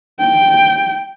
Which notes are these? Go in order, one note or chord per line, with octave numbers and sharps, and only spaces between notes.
G5